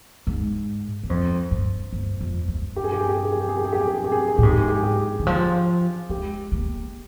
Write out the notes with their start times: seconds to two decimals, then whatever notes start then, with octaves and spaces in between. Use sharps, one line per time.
0.27 G#2
1.03 G2
1.10 F2 C5
1.51 G2
1.93 G2
2.21 F2
2.48 G2
2.76 G4
2.84 G#4
2.92 G4
3.00 G#4
3.09 G4
3.17 G#4
3.24 G4
3.32 G#4
3.40 G4
3.49 G#4
3.57 G4
3.65 G#4
3.73 G4
3.81 G#4
3.88 G4
3.96 G#4
4.04 G4
4.12 G#4
4.21 G4
4.28 G#4
4.36 A#2 G4
4.43 G#2 G#4
4.53 G4
4.59 G#4
4.68 G4
4.76 G#4
4.83 G4
5.19 D#3
5.27 F3
6.09 G#3 G4
6.52 A#3